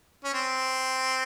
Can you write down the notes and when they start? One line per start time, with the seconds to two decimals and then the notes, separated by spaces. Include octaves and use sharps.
0.24 C#4
0.34 C4